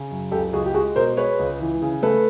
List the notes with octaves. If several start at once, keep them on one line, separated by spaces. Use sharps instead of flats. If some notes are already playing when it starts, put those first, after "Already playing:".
Already playing: C#3
F#2
C#2 G4 A4
C#2 F#4 G#4
G4
G#3 F#4 G#4
B2 A#4 C5
G#3 B4 C#5
C#2
E3
C#3
A3 A4 B4